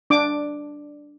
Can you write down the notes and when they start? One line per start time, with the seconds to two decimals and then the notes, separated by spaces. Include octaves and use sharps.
0.10 D4 D6